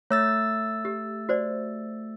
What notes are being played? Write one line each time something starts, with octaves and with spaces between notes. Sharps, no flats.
A3 C#5 E6 A6
G4
F#4 C5 D5